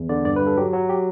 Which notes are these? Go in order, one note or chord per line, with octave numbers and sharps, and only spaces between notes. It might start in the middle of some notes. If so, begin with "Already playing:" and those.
Already playing: E2
D3 D5
G2 D5
B4
G2 A4
F#3 G4
F#3 F#4
G4